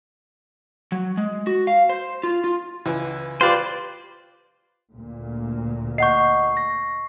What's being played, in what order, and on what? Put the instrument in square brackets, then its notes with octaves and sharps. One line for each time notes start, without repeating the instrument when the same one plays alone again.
[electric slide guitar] F#3
G#3
F#4
F5
C5
F4
F4
[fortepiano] C#2 E3
[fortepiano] F4 G4 B4 [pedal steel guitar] C5 D5
[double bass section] D2 A#2
[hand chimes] D#5 F#5 G6 [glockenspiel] C#6 C7
[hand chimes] A#6